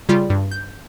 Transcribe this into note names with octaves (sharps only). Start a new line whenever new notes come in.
C#3 G3 F4
G2
G6